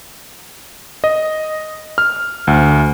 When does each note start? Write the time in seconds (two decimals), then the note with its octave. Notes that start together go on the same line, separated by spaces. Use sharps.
1.04 D#5
1.98 F6
2.47 D2